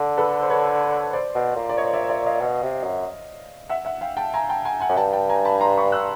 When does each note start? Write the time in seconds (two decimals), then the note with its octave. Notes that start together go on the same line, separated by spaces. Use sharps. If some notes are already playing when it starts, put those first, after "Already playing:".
Already playing: D3
0.17 A4 B4
0.41 C5
0.50 B4 C#5
1.13 C5 D5
1.35 B2
1.56 A#2
1.69 D5
1.77 C#5 D#5
1.93 D5 E5
2.09 D5 E5
2.26 D#5 F5
2.41 B2
2.63 C3
2.84 F#2
3.70 E5 F#5
3.85 E5 F#5
4.01 F5 G5
4.17 G5 A5
4.34 G#5 A#5
4.49 G5 A5
4.65 F#5 G#5
4.80 F#5 G#5
4.89 F#2
4.96 G2 G5 A5
5.13 G5 A5
5.30 G#5 A#5
5.45 A5 B5
5.61 A#5 C6
5.77 B5 C#6
5.92 E6 F#6